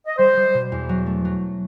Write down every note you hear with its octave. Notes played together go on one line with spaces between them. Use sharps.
D#5
G3 C5
G3
B2
E2
F#3
A3
F#3